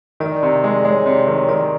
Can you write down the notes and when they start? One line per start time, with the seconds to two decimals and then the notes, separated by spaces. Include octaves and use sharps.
0.20 D#3 D5
0.43 C3
0.64 G#3
0.85 G#3 C#5
1.06 C3
1.27 D#3
1.49 D#3 D5